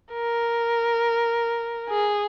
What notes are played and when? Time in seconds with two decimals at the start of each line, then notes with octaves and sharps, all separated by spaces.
0.13 A#4
1.89 G#4